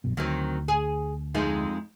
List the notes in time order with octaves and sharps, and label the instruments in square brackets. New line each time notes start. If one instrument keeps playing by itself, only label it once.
[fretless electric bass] A#1 F#2 B2
[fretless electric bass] D2 [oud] D#3 F#3 C4
[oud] G#4
F2 G#3 D#4